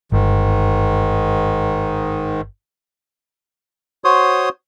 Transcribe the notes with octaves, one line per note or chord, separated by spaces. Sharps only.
G1 G#2 D#3
F#4 C5 C#5 C6 D#6